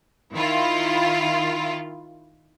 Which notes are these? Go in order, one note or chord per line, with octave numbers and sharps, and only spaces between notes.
D#3 E4 F4